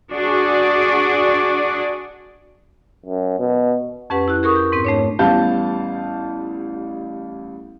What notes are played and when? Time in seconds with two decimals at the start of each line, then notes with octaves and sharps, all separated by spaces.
0.11 D4 F#4 G#4 D5
3.06 F#2
3.39 B2
4.10 F2 C#4 G4 B4 F#5
4.28 E4 G4 F#6
4.43 G#4 A#4 C#6 D#6
4.56 G6
4.72 G#2 C4
4.85 A3 D4 C#5
5.19 A1 G3 B3 F5 A5 G6